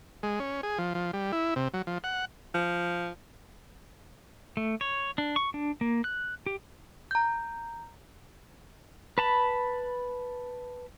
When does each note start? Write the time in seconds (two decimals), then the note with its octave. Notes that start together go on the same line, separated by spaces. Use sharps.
0.23 G#3
0.40 C#4
0.63 G#4
0.78 F3
0.94 F3
1.13 G3
1.32 E4
1.56 C3
1.74 F#3
1.87 F3
2.04 F#5
2.55 F3
4.57 A3
4.81 C#5
5.18 D4
5.36 C#6
5.54 D4
5.81 A#3
6.04 F#6
6.46 G4
7.11 A#5 G6
9.18 B4 A5 B5